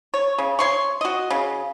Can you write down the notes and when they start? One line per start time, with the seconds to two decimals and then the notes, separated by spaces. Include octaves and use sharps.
0.14 C#5
0.38 C#3
0.59 C#5 C6 C#6
1.01 F#4 D#5
1.30 C#3